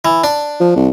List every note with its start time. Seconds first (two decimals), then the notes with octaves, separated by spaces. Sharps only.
0.05 E3
0.24 D4
0.60 F3
0.76 C2